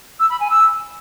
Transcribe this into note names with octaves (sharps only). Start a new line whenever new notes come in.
E6
B5
G#5
E6